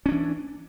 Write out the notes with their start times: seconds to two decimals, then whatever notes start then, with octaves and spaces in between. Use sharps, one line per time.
0.06 C#4
0.09 D4
0.12 E3